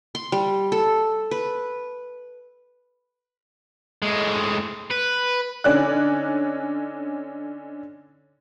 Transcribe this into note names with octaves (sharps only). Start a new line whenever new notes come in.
C6
G3
A4
B4
A2 G#3
B4
D3 C#4 D#4 D5 F#6